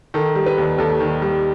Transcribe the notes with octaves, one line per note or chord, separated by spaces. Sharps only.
D#3 A4
G3
B4
D#2
D#2 A4
D#3
G3